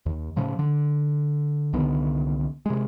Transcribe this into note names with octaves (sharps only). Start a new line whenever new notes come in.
D#2
A2 C#3 F3
D3
C2 D3 D#3 B3
C3 G#3